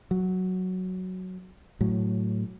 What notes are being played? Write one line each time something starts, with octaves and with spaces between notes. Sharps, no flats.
F#3
A2 F#3